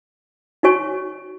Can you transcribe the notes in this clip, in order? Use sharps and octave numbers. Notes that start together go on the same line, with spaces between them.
D#4 F#4 C#5 G#5 C#6